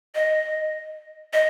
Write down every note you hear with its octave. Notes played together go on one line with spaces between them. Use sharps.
D#5
D#5